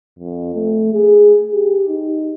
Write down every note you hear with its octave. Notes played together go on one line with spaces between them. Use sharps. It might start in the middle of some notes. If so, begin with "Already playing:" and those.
F2
A3
G#4
G4
D#4